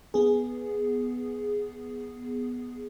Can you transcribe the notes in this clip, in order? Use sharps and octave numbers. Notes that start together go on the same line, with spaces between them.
B3 G#4